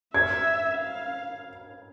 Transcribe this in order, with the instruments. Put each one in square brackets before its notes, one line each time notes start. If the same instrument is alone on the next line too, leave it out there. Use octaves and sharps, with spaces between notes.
[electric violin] E5 [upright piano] G#6
[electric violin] F5